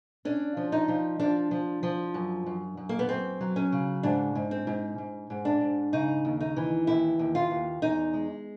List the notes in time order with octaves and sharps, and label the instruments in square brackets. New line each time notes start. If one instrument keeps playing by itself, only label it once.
[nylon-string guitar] C#4 [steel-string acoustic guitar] D4
[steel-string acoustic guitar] F3
[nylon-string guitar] D#4
[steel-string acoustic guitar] F3
[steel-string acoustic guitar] F3 [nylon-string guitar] D4
[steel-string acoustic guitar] F3
F3
F#2
F#2
F#2
[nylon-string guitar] A#3
B3
[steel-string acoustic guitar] F#2 [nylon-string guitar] C4
[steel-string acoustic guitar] F#3
[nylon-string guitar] C#4
[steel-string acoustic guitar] C#3
[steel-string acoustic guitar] G#2 [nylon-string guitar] D4
[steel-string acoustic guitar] G#2
[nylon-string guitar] C4
[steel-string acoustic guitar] G#2
G#2
G#2
[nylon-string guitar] D4
[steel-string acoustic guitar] G#2
[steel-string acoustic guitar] C#3 [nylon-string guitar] D#4
[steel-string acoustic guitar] D#2
[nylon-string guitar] D#4
[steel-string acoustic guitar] E3
[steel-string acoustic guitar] D#2 [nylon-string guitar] E4
[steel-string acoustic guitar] D#2
[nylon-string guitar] F4
[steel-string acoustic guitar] D#2
[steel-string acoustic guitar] E2 [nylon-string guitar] D#4
[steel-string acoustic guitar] G#3